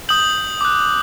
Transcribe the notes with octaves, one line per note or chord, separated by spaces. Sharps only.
D#6 G6 F#7
D6 F#6